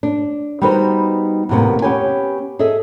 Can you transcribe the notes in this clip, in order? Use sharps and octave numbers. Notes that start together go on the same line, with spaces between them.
D4
G3 B3 D#4 F#4 B4 C5
E2 A2 C3 A#3 B3
B3 C#4 G4 B4 C#5 G#5
G#4 A4 D#5 E5